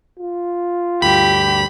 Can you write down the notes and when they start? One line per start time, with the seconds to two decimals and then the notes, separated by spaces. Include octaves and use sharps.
0.19 F4
1.02 D2 G2 G4 B5